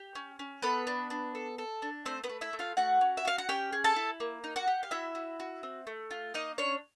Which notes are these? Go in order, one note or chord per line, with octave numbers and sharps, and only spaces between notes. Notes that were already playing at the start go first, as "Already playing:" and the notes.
Already playing: G4
C#4
C#4
B3 A4 B4
D4
D4
A4
A4
D4
A3 C4 C5
B3 B4
A3
E4 E5
A3
F4 F5
A3 F#4 F#5
C#4
E5
F#4 F5
F#5
C#4 G4 G5
G#4
A4 A5
E4
A#3
D#4
F#4 F#5
G4
F5
E4 F#4 E5
F#4
F#4
C4
A3
F4
A#3 D#4 D#5
C#4 D4 C#5